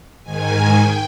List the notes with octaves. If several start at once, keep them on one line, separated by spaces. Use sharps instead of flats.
G#2 D#3 G#5
G5